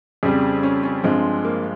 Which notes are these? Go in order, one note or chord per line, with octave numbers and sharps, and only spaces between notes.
F2 C#3 G3 G#4
C#4
C#4
G2 F3 G#3 C4
A#3